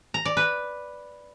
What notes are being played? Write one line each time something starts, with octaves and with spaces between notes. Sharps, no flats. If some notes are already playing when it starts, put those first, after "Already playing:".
A#5
D5
B4